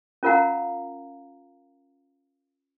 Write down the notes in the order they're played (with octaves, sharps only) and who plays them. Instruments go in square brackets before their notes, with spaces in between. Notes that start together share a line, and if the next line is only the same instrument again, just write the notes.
[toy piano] C#4 F4 A#4 F5 F#5 A#5